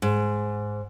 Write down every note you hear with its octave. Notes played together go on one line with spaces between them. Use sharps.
G#2